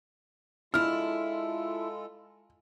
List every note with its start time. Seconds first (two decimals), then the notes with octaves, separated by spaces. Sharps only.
0.74 G#3 D4 E4 F4 A4 F6